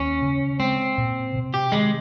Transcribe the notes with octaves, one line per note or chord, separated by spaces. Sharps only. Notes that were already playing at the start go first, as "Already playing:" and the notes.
Already playing: D#2 C#4
C#3
G#3 C4
A#2
C3
G4
D#3 G#3